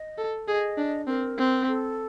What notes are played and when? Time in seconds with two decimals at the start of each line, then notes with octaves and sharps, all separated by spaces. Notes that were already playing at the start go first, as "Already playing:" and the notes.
Already playing: D#5
0.18 A4
0.48 G#4 D#5
0.77 D4
1.07 C4 A#4
1.38 C4
1.68 A4